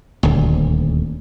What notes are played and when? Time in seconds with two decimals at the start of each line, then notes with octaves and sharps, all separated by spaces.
0.23 D#1 D2